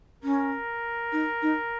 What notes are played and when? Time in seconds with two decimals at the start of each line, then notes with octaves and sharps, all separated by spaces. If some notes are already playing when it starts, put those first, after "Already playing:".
0.23 C#4 A#4
1.13 D#4
1.42 D#4